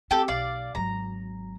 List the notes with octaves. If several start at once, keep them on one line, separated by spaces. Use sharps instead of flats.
C4 G4 A4
B1 D5 F5
G#1 F#3 A#5